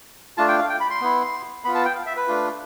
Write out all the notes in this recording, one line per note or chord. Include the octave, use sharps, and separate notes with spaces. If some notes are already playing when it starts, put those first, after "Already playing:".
A3 D4 F4 A5
G5
F5
G5
B5
C6
B3 E4
B3 F4 B5
A5
G5
F5
E5
B4
A3 D4 F4